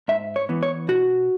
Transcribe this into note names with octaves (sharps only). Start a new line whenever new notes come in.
G#2 E5
C#5
E3 B3
C#5
B2 F#4